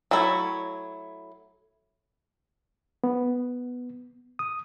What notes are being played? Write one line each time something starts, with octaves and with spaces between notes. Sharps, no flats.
F#3 A3 E4 C#5
B3
D#6